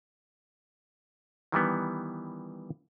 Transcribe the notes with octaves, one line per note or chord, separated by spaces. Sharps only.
D#3 E3 G3 B3